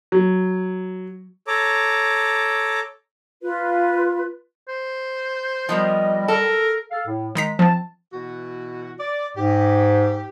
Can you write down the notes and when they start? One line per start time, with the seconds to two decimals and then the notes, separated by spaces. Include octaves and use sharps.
0.12 F#3
1.48 A4 C#5 A#5 D6
3.42 F4 B4
4.69 C5
5.69 F3 G3 B3 A#4 D#5
6.28 A4 A#4
6.91 A4 F5
7.07 A2
7.35 D#3 G#3 A#5 B6
7.59 F3 C4 A5
8.13 B2 E3 F#4
8.99 D5
9.37 G#2 G4